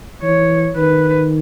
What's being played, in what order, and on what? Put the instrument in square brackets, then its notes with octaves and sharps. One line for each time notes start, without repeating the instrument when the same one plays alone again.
[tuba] E3 [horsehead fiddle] C#5
[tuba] D#3 [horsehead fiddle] B4